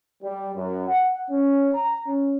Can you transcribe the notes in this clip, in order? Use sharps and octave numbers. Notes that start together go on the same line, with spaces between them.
G3
F#2
F#5
C#4
A#5
C#4